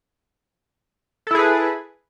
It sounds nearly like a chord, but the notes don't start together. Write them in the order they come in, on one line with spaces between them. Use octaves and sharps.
A4 E4 G#4 B4